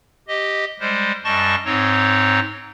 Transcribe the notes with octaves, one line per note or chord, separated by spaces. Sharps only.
G4 D#5
G3 G#3 C5
F#2 G3 D#5 A5 C#6 A6
G#2 C4 D#4 C#5